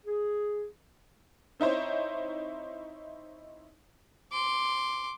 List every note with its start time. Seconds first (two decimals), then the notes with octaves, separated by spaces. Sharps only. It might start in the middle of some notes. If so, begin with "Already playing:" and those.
0.05 G#4
1.60 C4 D#4 E4 C5 C#5
4.32 C6 D6